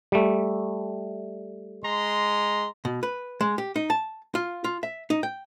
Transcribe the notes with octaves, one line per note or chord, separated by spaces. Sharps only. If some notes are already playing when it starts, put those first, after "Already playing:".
G3 A3
G#3 A#5 C6
B2
B4
G#3
G4
D#4
A5
F4
F4
E5
D#4
G5